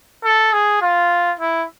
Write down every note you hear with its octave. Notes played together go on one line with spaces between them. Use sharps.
A4
G#4
F4
E4